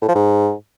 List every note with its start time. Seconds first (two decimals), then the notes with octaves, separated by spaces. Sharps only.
0.02 A2
0.08 F3
0.15 G#2